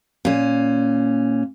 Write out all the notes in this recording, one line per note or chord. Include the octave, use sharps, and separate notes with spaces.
A#2 C#4